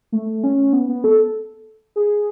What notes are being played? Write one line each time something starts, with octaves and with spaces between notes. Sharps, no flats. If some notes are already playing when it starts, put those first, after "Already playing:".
A3
C#4
B3
B3
A4
G#4